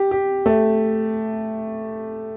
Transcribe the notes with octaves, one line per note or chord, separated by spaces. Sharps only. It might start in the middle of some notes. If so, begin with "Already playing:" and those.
Already playing: G4
G4
A3